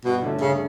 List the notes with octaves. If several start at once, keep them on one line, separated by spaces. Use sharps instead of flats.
G2 B2
D3 A3 C#4
G2 C#3